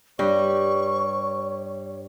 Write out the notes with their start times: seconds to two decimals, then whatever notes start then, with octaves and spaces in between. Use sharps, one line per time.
0.19 G2 G3 C#5 C#6